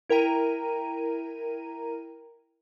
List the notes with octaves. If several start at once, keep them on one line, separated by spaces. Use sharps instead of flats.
E4 A#4 G5 A#5 D#7